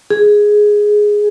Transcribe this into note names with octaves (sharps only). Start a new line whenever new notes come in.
G#4